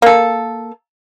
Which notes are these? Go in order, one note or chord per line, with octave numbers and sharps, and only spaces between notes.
A#3 A4